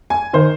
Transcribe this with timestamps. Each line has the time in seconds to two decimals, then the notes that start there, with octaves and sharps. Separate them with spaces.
0.10 G#5
0.33 D#3 C5